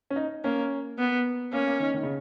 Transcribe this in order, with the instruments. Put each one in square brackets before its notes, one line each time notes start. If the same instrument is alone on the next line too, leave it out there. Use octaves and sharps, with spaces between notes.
[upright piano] C#4
D#4
[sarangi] A#3 [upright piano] C#4
[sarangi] B3
[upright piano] A#3 [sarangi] C#4
[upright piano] A#3
D#3
D#3
C#3